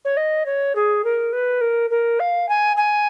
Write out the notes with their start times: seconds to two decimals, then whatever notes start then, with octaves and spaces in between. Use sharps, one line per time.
0.05 C#5
0.17 D#5
0.46 C#5
0.75 G#4
1.04 A#4
1.33 B4
1.61 A#4
1.90 A#4
2.20 F5
2.49 G#5
2.77 G#5